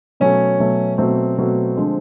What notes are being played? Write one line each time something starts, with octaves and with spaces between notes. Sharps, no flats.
B2 F#3 A3 C#4
B2 F#3 A3
B2 F#3 A3 C4
B2 F#3 A3
D3 F3 G#3